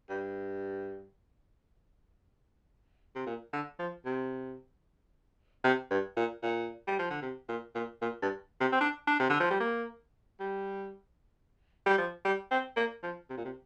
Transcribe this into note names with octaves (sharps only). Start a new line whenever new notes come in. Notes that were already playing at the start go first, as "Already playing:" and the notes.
G2
C3
A#2
D3
F3
C3
C3
G2
A#2
A#2
G3
F3
D3
C3
A#2
A#2
A#2
G2
C3
C4
D4
D4
C3
D3
F3
G3
A#3
G3
G3
F3
G3
C4
A#3
F3
C3
A#2
C3